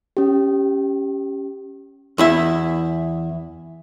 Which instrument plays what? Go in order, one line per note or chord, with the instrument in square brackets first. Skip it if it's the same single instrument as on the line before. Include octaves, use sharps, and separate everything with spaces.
[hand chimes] C#4 G4
[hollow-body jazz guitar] E2 E4 E5